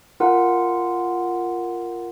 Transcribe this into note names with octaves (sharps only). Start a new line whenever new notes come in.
F4 A#4 F#5